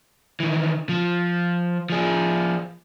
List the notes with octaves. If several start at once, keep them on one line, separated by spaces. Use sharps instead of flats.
D#3 E3
F3
F3 G#4